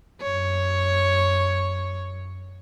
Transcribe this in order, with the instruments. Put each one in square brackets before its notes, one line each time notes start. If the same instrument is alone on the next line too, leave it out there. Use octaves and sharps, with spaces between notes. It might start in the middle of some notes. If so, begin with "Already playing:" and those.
[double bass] F#2 [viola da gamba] C#5